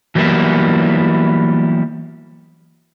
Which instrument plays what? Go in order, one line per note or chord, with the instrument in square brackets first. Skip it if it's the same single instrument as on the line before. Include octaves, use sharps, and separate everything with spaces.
[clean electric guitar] E3 F#3 G3 A#3 B3 E4